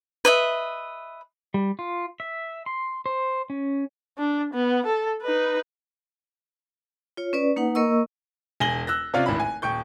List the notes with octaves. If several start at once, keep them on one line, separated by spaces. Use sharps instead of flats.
B4 D#5 E5
G3
F4
E5
C6
C5
C#4
D4
B3
A4
D#4 B4
F4 C#5
C#4 B4 D5
A#3 D#4 B4 F#5
A#3 A#4 D#5 C#6 E6
E1 G#5 A#6 F#7 G7
E6 F#6 A#6
C3 C#4 F4 C#5 D5 F5
D1 G#1 E4 E5 B5
G#5
D#1 G5 C#6 G6